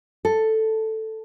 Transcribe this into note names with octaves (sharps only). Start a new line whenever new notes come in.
A4